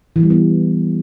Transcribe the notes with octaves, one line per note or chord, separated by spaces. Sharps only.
E3
G3
B3